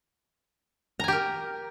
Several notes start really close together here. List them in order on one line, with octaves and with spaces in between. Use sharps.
A#5 G#5 G4 A#4